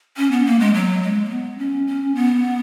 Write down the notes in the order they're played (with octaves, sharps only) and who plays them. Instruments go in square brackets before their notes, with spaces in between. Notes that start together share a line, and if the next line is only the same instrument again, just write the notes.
[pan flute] C#4
B3
A#3
G#3
F#3
G#3
A#3
B3
C#4
C#4
B3